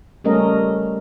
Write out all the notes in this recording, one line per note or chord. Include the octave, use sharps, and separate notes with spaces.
G3 A3 C#4 A#4 D#5